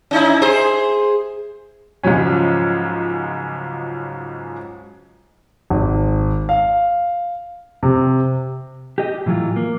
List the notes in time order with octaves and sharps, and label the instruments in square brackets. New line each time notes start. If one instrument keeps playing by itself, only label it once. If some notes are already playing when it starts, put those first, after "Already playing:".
[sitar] C#4 D#4 E4
G#4 C5
[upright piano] C#2 G#2 F3 F#3 C#4
[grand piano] G#1
F5
C3
[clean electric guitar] G4 D#5
A2 E3 F#3 F4
A#3